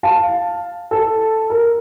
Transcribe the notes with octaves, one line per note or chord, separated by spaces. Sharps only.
F5 A5
A4
A#4